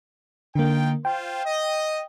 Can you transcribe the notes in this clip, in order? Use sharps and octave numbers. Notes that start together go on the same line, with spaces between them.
D3 A#3 D#4 F4 G5
F4 C5 G5
D#5